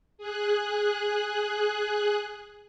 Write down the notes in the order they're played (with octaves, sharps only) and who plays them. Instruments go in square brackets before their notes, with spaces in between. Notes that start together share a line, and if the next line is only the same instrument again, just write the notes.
[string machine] G#4 F#6